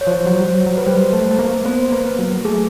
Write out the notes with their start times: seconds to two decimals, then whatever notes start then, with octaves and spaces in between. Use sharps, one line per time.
0.01 C#5
0.07 F3 C5
0.26 F#3
0.40 G3
0.47 F#3
0.66 F#3
0.77 B4
0.87 G3 C5
1.13 A3
1.31 A3
1.39 A#3
1.66 B3 C5
1.92 A#3 B4
2.19 F#3
2.45 A3 G#4